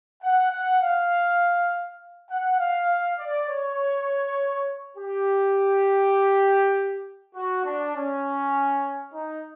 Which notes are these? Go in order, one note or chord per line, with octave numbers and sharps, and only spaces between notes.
F#5
F#5
F5
F#5
F5
D5
C#5
G4
F#4
D4
C#4
D#4